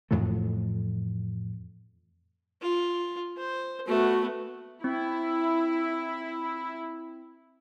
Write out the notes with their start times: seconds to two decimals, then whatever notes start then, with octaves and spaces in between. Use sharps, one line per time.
0.11 F2 A2 E3 A3
2.61 F4
3.37 C5
3.87 A3 B3 F#4
4.84 C4 E4